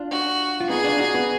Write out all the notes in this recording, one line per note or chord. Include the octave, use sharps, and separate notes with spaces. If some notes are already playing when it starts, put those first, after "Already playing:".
Already playing: D4 F4
F#4
F4
B3 D#4 G#4
D4 F4
D#4 F#4
B3 D#4